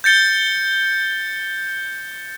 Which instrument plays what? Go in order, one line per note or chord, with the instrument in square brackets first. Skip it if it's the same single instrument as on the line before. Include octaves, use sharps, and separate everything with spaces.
[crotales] G6 A6 C#7 G7